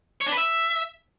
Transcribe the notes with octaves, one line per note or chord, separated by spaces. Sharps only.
C#5
D4
B4
E5